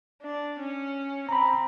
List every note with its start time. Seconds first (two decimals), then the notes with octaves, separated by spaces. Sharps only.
0.22 D4
0.59 C#4
1.29 C4 A#5 B5